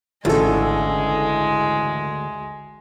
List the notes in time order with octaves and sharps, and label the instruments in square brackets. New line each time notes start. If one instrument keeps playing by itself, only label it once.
[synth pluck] G#1 A4 [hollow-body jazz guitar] D2 [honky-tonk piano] C#3 E3 [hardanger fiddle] G#3